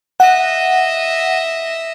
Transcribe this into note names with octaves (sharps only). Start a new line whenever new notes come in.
D#5 E5 F#5